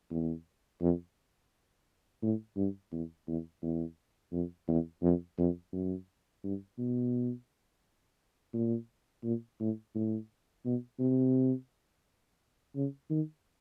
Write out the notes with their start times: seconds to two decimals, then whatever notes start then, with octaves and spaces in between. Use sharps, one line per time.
0.11 E2
0.81 F2
2.22 A2
2.56 G2
2.92 E2
3.27 E2
3.63 E2
4.32 F2
4.68 E2
5.02 F2
5.38 F2
5.73 F#2
6.44 G2
6.79 B2
8.54 A#2
9.24 A#2
9.60 A2
9.95 A2
10.65 B2
11.00 C3
12.75 C#3
13.10 D#3